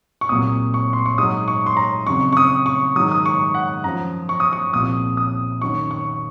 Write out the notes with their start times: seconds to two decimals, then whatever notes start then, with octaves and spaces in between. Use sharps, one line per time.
0.21 C#6
0.29 C2 A#2 F#3 D#6
0.74 C#6
0.93 C6
1.06 C#6
1.18 G#2 F#3 D#6
1.48 C#6
1.66 C6
1.77 A#5
2.07 F2 C#3 F#3 C#6
2.33 C#6
2.37 D#6
2.66 C#6
2.96 G#2 D#3 F#3 D#6
3.12 D#6
3.26 C#6
3.54 F#5
3.84 F#2 F3 A#5
4.29 C#6
4.40 D#6
4.53 C#6
4.73 C2 A#2 F3 D#6
5.17 D#6
5.62 F#2 D#3 F#3 C#6
5.91 C#6